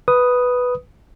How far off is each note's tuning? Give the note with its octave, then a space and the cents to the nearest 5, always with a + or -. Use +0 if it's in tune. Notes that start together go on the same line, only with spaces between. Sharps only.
B4 +0 D#6 +0